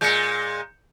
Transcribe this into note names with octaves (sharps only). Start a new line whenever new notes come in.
A#2 G#3 G6 C#7